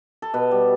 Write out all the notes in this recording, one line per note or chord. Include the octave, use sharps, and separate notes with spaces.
A4
B2 B4
G3